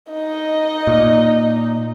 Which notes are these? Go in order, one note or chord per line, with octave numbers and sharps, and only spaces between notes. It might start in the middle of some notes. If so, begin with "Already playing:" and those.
D#4 D#5
A#2